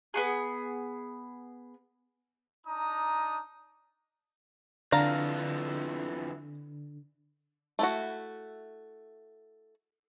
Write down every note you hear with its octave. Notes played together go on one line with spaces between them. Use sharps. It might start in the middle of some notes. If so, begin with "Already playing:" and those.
B3 F#4 G#4
D4 D#4 A#5 D#6
F2 D3 E3 F5 A#5
A3 E4 F#4